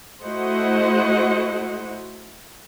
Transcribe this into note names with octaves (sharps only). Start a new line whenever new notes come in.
A3 E4 F#4 C5 D#5 F#5